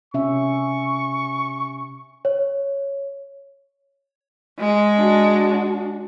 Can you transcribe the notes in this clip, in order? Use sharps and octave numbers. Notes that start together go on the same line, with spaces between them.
C3 C#4 E5 C#6
C#5
G#3
D4 F#4